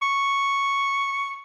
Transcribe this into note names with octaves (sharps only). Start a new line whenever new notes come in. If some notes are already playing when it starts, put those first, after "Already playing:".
C#6